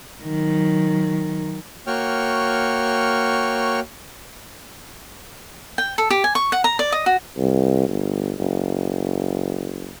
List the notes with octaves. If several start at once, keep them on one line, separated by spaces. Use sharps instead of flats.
D#3 F#3
A#3 F#4 C#5 G5 C#6 F6
G5
A4
G4
G#5
C#6
F#5
A#5
D5
D#5
F#4
C2
G1
F#1